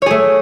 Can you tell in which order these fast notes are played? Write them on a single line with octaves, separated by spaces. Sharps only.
C#5 G#4 A3